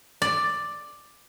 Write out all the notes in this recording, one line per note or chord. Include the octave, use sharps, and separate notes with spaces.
D5